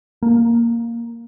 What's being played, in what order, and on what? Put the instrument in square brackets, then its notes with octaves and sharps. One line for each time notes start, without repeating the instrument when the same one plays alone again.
[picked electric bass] A#3